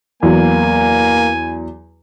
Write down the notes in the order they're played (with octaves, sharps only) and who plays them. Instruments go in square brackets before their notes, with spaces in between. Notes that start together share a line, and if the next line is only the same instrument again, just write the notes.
[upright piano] E2 F#3 [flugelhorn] A#3 [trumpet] G#5